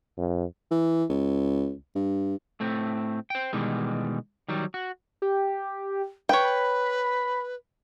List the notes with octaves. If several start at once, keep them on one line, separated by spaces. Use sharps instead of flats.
F2
E3
C#2
G2
A2 A3 C4
C5 G5
B2 D#3 E3 G3 G#3
D#3 F#3 G3
F#4
G4
B4 C#5 G5
B5